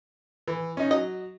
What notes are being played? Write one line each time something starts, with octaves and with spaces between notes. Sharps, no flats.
E3
C#4 D#4
F#3 D#5